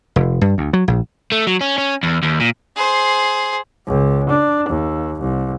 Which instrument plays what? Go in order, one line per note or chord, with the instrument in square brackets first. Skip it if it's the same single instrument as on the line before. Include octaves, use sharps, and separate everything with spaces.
[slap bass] F1
G2
D2
F#3
A#1
[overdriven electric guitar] A3
F#3
C#4
C#4
E2
D#2
A#2
[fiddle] G#4 C5
[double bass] C#2
D4
D#2
C2